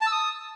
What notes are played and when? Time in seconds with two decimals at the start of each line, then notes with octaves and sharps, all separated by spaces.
0.01 A5
0.07 E6
0.12 D#6